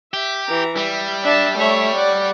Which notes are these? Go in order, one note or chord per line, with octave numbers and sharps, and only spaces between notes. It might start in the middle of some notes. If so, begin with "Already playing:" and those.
G4 E5
E3 A#5
G3 E5
D4 E5 A5
A3 C#5 E5
D5 F#5